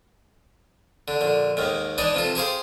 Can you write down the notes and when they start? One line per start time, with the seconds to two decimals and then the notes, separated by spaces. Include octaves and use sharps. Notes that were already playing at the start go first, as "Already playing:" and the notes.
1.08 D3
1.21 A#1 D3
1.57 D#2 G#2 D#3
1.98 E3 D4 D#4 D5 D#5
2.14 C3 F3 A4
2.35 G4 G#4 C5 F5